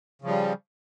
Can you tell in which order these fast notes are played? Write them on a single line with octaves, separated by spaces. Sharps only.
C#3 F3 G3